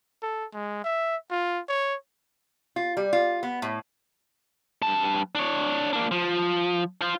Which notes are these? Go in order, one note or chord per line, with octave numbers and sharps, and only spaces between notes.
A4
G#3
E5
F4
C#5
F4
G3
F4
B3
A2
G2 A5
D4 C#5
A#3 D4
F3
F4 C5